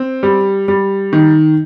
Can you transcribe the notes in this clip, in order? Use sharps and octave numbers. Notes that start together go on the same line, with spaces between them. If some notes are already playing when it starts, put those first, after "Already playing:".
Already playing: C4
G3
G3
D#3